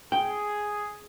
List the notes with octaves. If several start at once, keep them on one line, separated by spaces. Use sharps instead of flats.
G#4 G5